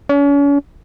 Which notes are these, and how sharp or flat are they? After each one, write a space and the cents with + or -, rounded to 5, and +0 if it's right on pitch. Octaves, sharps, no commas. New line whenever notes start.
C#4 +40